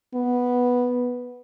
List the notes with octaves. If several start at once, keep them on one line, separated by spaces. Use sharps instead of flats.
B3